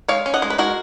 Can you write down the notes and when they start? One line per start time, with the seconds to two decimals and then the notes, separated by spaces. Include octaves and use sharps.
0.08 G#3 C#5 F5
0.26 C#4
0.34 D#5 F#5
0.42 G#3
0.50 B4
0.58 G#3 F#4 A#4